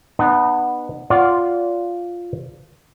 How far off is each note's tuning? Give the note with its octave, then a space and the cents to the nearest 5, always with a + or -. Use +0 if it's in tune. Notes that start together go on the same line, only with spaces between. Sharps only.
B3 -5 D#4 -45
F4 +0 D5 -30 F#5 +0